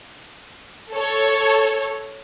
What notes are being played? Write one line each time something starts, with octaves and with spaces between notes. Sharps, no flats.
A4 C#5